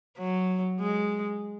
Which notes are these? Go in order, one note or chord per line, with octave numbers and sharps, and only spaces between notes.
F#3
G#3